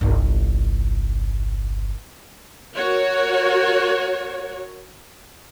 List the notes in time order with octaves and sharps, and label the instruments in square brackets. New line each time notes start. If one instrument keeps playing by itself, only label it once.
[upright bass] G1 C2
[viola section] F#4 A#4 C#5